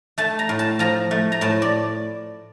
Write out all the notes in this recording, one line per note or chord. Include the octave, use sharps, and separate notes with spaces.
A3 A5
A#5
A2
A5
F3 A#5
A3
A#5
A2 A5
D5